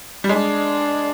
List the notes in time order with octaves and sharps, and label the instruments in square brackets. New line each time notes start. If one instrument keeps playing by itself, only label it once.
[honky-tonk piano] G3
[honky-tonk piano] G#3 [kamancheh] D4